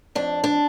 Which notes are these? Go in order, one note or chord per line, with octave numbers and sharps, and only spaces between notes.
F2 D4
D4